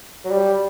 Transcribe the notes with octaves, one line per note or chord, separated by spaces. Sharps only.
F#3
G3